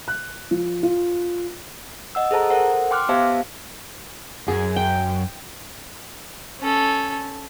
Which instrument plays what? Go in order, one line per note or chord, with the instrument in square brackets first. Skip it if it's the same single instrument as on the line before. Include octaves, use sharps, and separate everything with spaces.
[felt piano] F#6
F3
F4
[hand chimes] D#5 F#5 E6
G#4 A4 C5 A5 A#5
A4 A#4 C5 F#5
G5 C6 D6 F6 F#6
B3 G4 C5 E5 F5 A5
[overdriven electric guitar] F#2 [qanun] G#4
[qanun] G5
[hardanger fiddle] C#4 A4